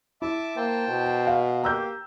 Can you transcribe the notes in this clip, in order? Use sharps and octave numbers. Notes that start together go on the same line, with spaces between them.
E4 E5 A5 D6
A#3 C5 G5 A5
B2
F5
A#3 G4 A#5 E6 G6